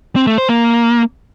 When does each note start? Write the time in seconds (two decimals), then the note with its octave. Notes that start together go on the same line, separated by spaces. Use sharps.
0.16 C4
0.27 A3
0.38 C5
0.49 A#3